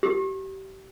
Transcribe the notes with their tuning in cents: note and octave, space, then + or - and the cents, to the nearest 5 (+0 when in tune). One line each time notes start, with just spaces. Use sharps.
G4 -30